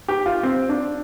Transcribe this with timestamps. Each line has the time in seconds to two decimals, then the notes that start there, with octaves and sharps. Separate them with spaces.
0.08 G4
0.26 F4
0.43 C4
0.69 D4